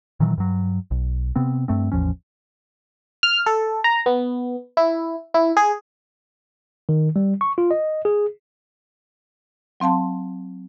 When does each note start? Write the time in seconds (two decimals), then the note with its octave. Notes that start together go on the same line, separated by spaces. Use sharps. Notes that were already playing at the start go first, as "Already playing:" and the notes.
0.20 A#2 D#3 E3 F#3
0.38 G2 F#3
0.91 B1
1.36 C3 B3 C4
1.68 G2 A3 C4
1.92 A1 E2 F3 C#4
3.23 F6
3.46 A4
3.84 A#5
4.06 B3
4.77 E4
5.34 E4
5.57 G#4
6.89 D#3
7.16 G3
7.41 C#6
7.58 F4
7.71 D#5
8.05 G#4
9.80 F#3 C4 F5 A5 C6